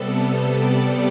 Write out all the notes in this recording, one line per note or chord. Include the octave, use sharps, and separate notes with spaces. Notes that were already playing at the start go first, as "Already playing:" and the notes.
Already playing: C3 G3 B3 A4
D5